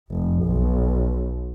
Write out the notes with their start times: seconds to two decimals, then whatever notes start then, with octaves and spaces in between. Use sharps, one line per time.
0.10 F1
0.44 B1